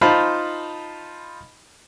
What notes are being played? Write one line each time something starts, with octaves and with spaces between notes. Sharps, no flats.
D#4 F4 C5 F5 A5 B5